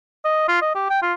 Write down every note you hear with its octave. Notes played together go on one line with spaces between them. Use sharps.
D#5
F4
D#5
G4
G5
F4